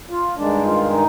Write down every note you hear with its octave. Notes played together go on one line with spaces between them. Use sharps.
F4
G2 D#3 G#3 D4
F4
D#4